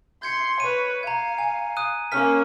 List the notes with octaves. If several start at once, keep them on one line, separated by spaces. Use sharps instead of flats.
C6 G6 G#6 C#7
B4 C#5 D#7
F5 A#5 G#6
G#5
D#6 F#6 D#7
A#3 C#4 F6 B6